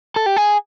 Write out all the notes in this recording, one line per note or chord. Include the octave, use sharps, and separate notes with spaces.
A4
G4
G#4